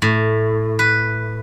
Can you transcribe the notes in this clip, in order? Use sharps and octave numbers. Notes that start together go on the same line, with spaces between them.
A2
B4